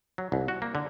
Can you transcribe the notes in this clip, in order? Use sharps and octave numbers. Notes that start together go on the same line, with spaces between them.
F#3
C2
F#4
A#3
D3